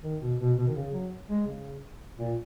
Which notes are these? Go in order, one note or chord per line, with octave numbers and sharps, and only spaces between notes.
D#3
B2
B2
B2
D#3
C#3
F#3
G#3
C#3
A#2